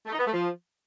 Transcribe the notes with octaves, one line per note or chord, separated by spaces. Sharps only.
A3
D#4
B3
A3
F3